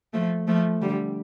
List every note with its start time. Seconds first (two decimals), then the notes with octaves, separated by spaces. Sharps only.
0.14 F3 A3
0.48 F3 A3
0.82 D3 G3